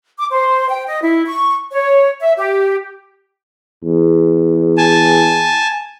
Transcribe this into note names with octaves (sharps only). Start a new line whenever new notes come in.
D6
C5
G5
D#5
E4
C#6
C#5
E5
G4
E2
G#5 A5